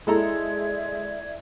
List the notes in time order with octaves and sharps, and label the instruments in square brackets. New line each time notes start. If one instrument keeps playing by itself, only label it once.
[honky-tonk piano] G#3 [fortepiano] E4 A4 A#5 [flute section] D5 E5 G#6